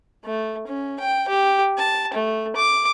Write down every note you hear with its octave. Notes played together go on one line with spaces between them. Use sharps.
A3
C#4
G5
G4
A5
A3
D6